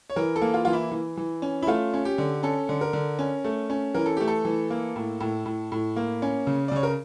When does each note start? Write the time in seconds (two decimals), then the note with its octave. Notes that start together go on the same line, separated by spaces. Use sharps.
0.10 C#5
0.16 E3 A#4
0.36 A4
0.42 A#3
0.54 F4
0.65 E3 F4
0.73 E4
0.91 E3
1.17 E3
1.42 C#4
1.63 E4
1.67 A3 F4
1.93 C#4
2.05 G4
2.18 D3
2.43 C#4 A4
2.69 D3
2.81 A#4
2.93 D3
3.19 C#4
3.44 A3
3.70 C#4
3.94 E3 A#4
4.06 A4
4.17 A3 G4
4.28 A4
4.45 E3
4.70 A#3
4.96 A2
5.20 A2
5.46 A2
5.72 A2
5.96 A#3
6.22 C#4
6.47 C#3
6.68 D5
6.71 C#3 C#5
6.83 A#4